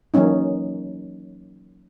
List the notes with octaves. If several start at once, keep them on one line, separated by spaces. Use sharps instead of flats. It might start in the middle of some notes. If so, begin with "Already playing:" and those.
E3 F#3 A#3 C#4 D#4